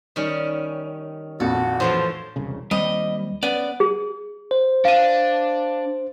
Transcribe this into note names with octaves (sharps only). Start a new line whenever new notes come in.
D#3 G3 C#4
A#1 F2 F#4 A4
A2 E3 F3 C5
E1 C2 C#3
D#2 G3 C4 D#5
B3 C#4 D5
G#4
C5
D4 F5 D#7